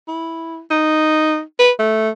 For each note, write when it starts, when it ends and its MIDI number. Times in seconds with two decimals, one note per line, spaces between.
0.08 0.61 64
0.71 1.41 63
1.59 1.72 71
1.79 2.09 57